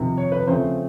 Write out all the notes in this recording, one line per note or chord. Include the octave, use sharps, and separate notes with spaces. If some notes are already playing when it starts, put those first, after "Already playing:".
Already playing: F2 C3 D#3
C#5
B4
C#3 F3 A3 C4 C5